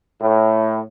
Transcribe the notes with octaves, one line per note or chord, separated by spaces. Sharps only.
A2